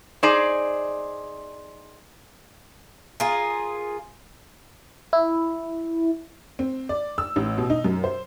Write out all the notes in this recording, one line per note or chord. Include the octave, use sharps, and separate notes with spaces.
D#4 G#4 C5 D5
F4 G#4 A#4
E4
C4
D5
E6
A1
B2
D#4
F#2
C5